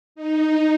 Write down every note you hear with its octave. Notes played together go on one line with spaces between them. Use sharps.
D#4